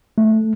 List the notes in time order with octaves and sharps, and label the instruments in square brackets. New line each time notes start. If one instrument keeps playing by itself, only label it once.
[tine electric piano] A3